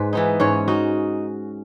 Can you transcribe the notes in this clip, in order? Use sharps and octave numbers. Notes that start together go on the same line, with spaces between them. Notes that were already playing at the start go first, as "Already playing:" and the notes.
Already playing: G#2 G#3 B4
E3 B3 D#4
G#2 C#4 C#5
D#4 F#4